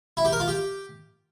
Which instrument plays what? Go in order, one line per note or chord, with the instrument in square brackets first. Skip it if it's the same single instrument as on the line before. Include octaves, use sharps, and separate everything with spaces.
[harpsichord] E4
G4
A#4
F4
G4